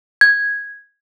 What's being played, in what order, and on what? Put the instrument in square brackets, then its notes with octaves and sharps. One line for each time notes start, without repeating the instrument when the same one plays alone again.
[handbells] G#6